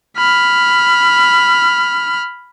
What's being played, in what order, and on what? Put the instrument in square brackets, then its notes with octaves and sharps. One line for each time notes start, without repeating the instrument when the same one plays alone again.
[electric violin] B5 F6